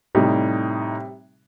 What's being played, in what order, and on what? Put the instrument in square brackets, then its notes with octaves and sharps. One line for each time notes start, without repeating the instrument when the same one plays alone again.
[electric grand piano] A2 D#4 [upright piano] C3 G3